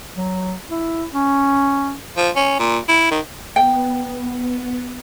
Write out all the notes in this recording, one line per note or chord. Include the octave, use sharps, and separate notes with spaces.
F#3
E4
C#4
F3
C#4
A#2
E4
D#3
B3 G5